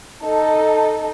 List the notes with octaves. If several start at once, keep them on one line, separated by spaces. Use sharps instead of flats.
D#4 A4